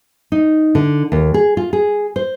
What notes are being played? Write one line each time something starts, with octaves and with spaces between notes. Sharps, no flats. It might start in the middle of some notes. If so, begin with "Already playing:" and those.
D#4
D3
D#2
G#4
F4
G#4
C5